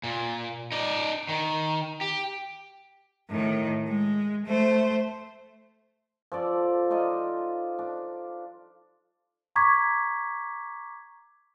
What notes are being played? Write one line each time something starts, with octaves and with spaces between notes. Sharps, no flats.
A#2
D#4 D5
D#3
G4
A2 D#3
G#3
A3 C5
F3 A4 D5
D#4 F4 D5 D#5
D4
A#5 C#6 D6 G#6 B6